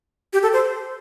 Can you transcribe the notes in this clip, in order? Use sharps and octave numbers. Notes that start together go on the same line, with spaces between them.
G4
A4
C5